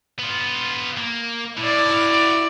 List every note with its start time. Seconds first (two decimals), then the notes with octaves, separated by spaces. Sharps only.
0.19 B3 F4
0.98 A#3
1.57 A2 E4 D5
1.91 F#4 F5